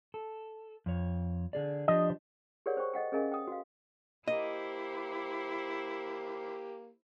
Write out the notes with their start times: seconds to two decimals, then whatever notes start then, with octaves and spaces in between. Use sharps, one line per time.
0.14 A4
0.86 F2 C#5
1.53 D3 G#4 D5
1.88 F3 D4 G4 D#5
2.66 G4 G#4 A#4 C#5 D5 F#5
2.77 C5 G5 C#6
2.93 A4 D#5 F#5 G5
3.12 C#4 G#4 A#4 D#5 F5 G#5
3.32 G5 D#6
3.47 F#4 F5
4.28 A#3 E4 G4 C5 D#5